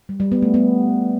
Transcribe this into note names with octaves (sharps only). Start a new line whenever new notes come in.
G3
G3
B3
A3
B3